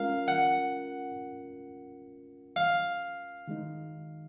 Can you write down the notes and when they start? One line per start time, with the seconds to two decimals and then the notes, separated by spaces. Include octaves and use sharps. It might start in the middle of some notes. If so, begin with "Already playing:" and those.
Already playing: G#3 C#4 F4 A#4 F5
0.28 F#5
2.56 F5
3.47 D#3 G#3 D#4